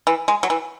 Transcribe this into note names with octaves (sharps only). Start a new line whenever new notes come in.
E3
G#3
F#3
E3